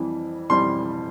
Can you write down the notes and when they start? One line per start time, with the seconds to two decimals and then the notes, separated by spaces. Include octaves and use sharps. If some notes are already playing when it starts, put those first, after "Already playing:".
Already playing: F2 E3 G3
0.49 F2 E3 G3 C6